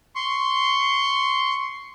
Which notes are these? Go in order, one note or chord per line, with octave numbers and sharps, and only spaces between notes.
C6 C#6